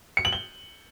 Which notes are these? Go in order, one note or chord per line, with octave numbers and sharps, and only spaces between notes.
C#7
F#7
G7